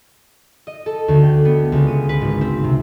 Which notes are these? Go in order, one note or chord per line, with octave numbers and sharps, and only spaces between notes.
D#5
A4
D2
G5
B3
C#2
D#6
B4
G#1
C4
C3